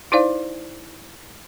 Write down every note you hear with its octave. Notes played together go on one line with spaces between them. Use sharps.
D#4 E4 C5 D5 F5